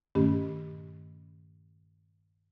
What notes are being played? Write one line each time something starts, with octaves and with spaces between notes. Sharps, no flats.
G2 A#2 D#3 A3 C#4 G4